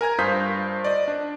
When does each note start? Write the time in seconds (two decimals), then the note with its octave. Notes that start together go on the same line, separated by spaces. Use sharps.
0.01 A#4 G#5 A#5 G#6
0.19 G2 F4 C5 D#6 G6 B6
0.84 D5 D#5
1.08 D4